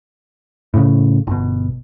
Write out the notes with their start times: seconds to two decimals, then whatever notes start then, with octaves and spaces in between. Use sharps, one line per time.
0.74 A2 C#3
1.27 G1 B2